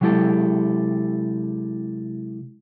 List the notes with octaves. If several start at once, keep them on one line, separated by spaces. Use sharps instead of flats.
C3 F#3 G#3 E4 G4 A4